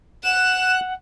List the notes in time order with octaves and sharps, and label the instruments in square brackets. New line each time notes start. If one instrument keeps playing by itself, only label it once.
[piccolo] F#5 [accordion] F#6 [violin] E7